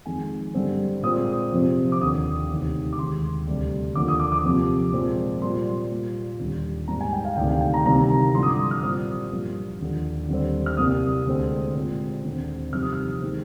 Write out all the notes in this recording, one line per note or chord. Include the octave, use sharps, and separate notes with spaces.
F2 D#3 G#3 G#5
G2 D3 G3 C4
A#2 G#3 C4 D#6
F2 C3 F3 C4
D6
D#2 D3 F3 A#3 D#6
D2 C3 D#3
D6
D#2 D#3 G#3 C6
D2 C3 G3
D#2 D3 F3 A#3 D6
D#6
D6
D6
F2 C3 F3 A#3
A#2 F3 G#3 C4
A#2 G3 C4 C6
A#2 G3 A#3
D#2 D3 G3
G#2 G3 A#3 A#5
G#5
G5
F5
D2 C3 D#3 G5
F5
G5
A#5
C2 C3 D#3 A#3 A#5
A#5
G2 D3 F3 C6
D#6
D6
D#6
F6
A#2 G3 C4 D#6
G2 F3 A#3
D#2 D3 F3
D#2 D3 G3 C4
F6
C2 C3 G3 A#3 D#6
D2 D3 G#3 C4
A#2 G#3 C4
D#2 D3 G#3 C4
F2 C3 D#3 G3 C4 F6
D#6
F6
D#3 G#3 C4